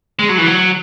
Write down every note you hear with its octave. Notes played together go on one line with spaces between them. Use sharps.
G#3
F#3
E3
F#3